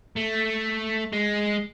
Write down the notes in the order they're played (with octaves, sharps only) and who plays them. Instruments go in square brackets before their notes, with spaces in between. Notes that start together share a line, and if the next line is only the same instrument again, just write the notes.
[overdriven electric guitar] A3
G#3